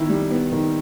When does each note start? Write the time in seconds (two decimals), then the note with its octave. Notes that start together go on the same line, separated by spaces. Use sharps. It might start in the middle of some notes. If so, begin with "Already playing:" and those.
Already playing: D#3 B3 E4
0.09 G3
0.31 B3
0.52 D#3